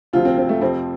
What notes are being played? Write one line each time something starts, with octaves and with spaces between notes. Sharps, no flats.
D2 C3 F3 F4
C4
C4
A3
F2 C3 F3 C4